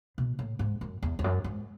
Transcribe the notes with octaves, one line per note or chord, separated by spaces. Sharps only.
B2
A2
G#2
F#2
E2
E2
F#2
G#2